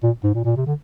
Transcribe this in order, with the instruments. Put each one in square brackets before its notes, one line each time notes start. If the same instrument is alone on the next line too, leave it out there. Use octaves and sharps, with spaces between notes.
[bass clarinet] A#2
G#2
A#2
A#2
C3
D3